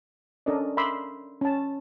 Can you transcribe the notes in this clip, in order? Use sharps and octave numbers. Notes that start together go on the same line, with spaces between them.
C#4 D4 A4 A#4 D5 D#5
A#4 E5 B5 C6 D6 E6
C#4 A5